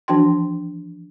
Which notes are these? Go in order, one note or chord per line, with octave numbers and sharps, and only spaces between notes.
E3 F3 D4 F#4 G5 C6